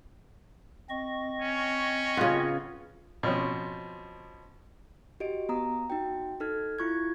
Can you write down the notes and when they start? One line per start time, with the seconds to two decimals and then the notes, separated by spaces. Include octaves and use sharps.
0.89 C4 D#5 C#6
1.42 C#4
2.17 C#3 B3 F4
3.23 B2 F3 C4 C#4
5.20 F#4 G4 D#5 D7
5.49 B3 A#5 D#6
5.90 D#4 F#4 G5
6.40 D#4 A4 F6 G#6
6.79 E4 F4 C#6 F#6 G#6